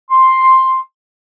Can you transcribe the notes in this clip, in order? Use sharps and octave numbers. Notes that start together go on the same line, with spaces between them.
C6